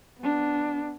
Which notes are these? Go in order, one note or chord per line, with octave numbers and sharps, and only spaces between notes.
B3 D4